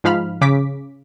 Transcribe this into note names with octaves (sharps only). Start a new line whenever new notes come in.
G#2 F3 F5 B5 F6
C#3 D6 B6